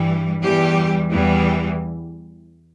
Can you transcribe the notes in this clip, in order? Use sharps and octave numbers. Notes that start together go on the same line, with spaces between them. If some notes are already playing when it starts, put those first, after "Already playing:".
Already playing: G2 E3 G3
E2 E3 G3 G4
E2 E3 G3